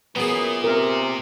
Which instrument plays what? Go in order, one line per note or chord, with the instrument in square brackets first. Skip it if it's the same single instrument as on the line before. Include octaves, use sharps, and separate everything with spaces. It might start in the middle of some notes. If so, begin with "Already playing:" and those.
[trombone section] F#2 [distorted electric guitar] A#2 [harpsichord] B3 G#4
[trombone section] C3 [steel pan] A#4